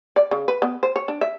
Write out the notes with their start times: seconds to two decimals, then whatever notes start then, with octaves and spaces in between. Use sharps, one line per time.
0.16 D5
0.31 C#3
0.48 B4
0.62 B3
0.83 C5
0.96 C#5
1.08 D4
1.21 E5